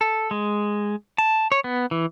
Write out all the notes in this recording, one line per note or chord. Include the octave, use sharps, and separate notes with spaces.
A4
G#3
A5
C#5
B3
E3